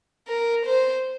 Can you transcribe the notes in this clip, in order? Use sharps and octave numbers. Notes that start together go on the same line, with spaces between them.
A#4
C5